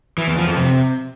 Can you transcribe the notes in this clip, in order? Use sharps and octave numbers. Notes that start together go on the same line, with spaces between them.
E3
E2
F3
F2
C3